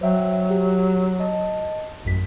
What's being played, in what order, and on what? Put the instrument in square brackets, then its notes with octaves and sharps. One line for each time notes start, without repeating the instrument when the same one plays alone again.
[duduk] F#3 [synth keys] C5 E5 G5
[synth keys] G4
D#5 A5
A1 F#2 B6